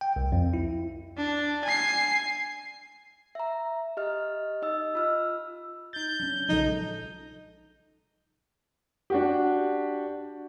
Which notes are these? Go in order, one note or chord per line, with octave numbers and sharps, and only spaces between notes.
G5
C2
F2
E4
D4
G#5 C7
E5 A#5
G4 D#5 F6
D#4 D#5 E6
F4 E6 F6
D#4 G6 A6
F#3 C#4 D4
A#1 C#3 F3 F#3 G#3 D#4 A4
D4 F#4 G4